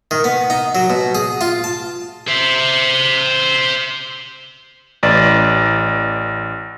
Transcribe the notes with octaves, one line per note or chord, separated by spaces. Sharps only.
D#3
B3
D#4
F#3
B2
G#4
F4
A5
C5 E5
A1 D5 A6